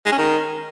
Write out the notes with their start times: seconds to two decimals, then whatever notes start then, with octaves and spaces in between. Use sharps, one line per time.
0.06 G#3
0.12 C#4
0.18 D#3